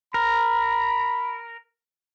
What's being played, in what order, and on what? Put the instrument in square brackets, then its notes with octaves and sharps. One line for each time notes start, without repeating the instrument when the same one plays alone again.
[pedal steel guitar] A#4 [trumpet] B5